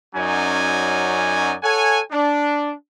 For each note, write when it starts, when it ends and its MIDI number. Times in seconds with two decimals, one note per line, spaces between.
0.15 1.55 42
0.15 1.55 54
0.15 1.55 61
0.15 1.55 63
0.15 1.55 74
0.15 1.55 80
1.63 1.99 69
1.63 1.99 73
1.63 1.99 78
1.63 1.99 80
2.10 2.71 62